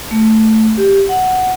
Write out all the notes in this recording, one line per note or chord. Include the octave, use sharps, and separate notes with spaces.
A3
G4
F#5